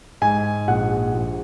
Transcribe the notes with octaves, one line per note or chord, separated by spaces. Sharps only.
G#2 G#5
A#1 F#5
A#1